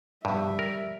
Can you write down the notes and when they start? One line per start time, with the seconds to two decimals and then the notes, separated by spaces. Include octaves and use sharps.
0.25 G2 B2 G3 E5
0.59 A#4